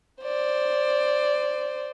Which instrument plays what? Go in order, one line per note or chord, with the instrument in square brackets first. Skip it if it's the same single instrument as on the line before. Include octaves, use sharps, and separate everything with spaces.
[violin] C5 D5